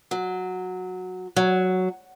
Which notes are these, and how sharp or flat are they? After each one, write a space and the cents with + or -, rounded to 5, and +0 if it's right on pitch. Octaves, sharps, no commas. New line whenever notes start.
F#3 -10
F#3 +0